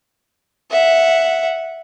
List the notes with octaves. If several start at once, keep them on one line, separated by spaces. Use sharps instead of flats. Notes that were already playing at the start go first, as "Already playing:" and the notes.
E5 F#5